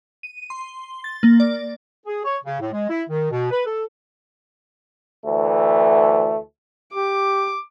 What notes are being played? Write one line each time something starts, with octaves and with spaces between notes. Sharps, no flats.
D#7
C6
A6
A#3
D5
G#4
C#5
C#3
A2
G#3
E4
D#3
B2
B4
A4
D2 E3 A3
G4 D6